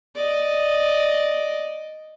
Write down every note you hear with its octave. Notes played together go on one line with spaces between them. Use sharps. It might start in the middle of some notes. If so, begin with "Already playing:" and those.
D5 D#5